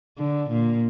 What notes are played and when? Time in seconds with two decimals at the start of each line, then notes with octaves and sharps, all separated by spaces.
0.17 D3
0.49 A#2